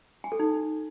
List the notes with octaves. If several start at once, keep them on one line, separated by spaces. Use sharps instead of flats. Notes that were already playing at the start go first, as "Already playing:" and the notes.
G#5
A4
D#4